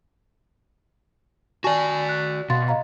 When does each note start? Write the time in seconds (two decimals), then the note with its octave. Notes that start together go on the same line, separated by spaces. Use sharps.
1.64 F#4 D5 G#5 A5 C#6
2.09 F#6
2.50 B2 F5 C6 A6
2.68 D#5 F5 A#5